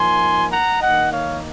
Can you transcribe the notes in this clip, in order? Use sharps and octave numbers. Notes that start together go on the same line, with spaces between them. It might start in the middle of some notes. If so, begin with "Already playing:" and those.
Already playing: F3 A#3 D#4 G#5 C6
F#5 A#5
D#3 A#3 D#4 D#5 F#5
C#5 F5